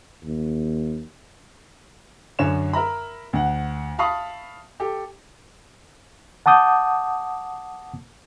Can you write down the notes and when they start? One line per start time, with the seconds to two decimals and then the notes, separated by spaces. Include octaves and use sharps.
0.24 D#2
2.39 F#2 D3 C#5 E7
2.73 A#4 E5 A#5 B5
3.33 D2 F#5
3.98 E5 F5 A5 B5 C#6 D#6
4.80 G4 A4
6.46 F#5 A5 D6 D#6 G6